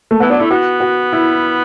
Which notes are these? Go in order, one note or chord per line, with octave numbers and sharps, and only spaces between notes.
A3
E3 B3
F#3 D4
A3 E4
B3 F#4
F#4
E4